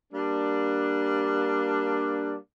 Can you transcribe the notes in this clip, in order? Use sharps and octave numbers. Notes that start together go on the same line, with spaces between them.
G3 A#3 D4